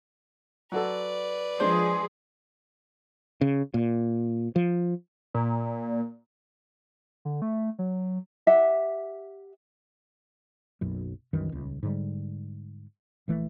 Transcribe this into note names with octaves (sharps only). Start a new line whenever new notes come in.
F#3 F#4 A4 B4 D5
F3 G#3 D4 G#4 C5 C6
C#3
A#2
F3
A#2
D3
A3
F#3
G4 E5 F#5
F#1 B1 F#2
C2 F#2 D#3 E3
D#1 C#2
G#2 D3 G3
A#1 E3 A3